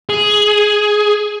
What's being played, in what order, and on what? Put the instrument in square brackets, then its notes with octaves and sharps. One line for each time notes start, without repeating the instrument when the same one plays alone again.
[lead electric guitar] G#4